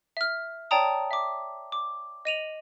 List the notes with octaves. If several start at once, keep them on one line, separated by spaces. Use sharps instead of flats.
E5 F6
C#5 D5 G5 A5 A#5 D#6
E5 D6
D6
D#5 D#7 F7 F#7